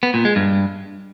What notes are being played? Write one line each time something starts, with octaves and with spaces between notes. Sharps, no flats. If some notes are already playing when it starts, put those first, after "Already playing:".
B3
A#2
G#3
G2